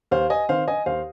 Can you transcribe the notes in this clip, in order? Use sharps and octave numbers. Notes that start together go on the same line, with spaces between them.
D#2 C5 F5
D#5 G#5
D#3 C4 C5 F5
D#5 G#5
D#2 C5 F5